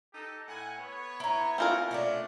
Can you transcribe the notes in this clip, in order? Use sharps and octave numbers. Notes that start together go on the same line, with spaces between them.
D#4 G4 A4
A2 F#5 G#5
B3 C#5
E4 A#5
C4 F4 A#4
A3 C#4 D4